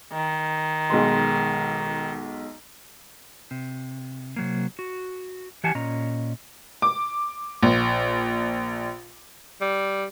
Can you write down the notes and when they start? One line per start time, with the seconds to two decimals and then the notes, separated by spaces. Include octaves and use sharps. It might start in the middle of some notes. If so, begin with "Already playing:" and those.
0.12 D#3
0.90 B1 G#3 C6
3.51 C3
4.36 C3 F#3 A#3
4.79 F#4
5.64 E3 G4 F#5 G#5 A5
5.75 A#2 C#4 D#5 A#5
6.82 D6
7.62 A#1
9.61 G3